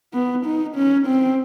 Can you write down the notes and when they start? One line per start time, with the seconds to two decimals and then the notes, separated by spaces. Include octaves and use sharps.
0.14 B3
0.45 D#4
0.76 C#4
1.07 C4